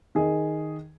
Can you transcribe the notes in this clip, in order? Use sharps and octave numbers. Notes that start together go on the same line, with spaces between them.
D#3 G#4 D#5